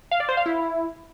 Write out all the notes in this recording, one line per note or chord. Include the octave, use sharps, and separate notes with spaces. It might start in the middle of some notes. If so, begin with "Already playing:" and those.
F5
D5
C5
F5
E4